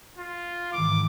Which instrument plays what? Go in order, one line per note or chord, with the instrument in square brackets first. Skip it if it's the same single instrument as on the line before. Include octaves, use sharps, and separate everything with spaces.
[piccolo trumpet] F4
[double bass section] G#2 D#3 E3 [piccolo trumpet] D6